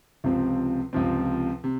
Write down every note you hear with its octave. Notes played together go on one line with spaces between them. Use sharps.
C#2 C3 F3 C4
C#2 C3 F3 C4
C3